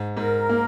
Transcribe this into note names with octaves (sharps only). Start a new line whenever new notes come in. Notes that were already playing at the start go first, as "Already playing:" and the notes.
Already playing: G#2
G#2 A#4
A#3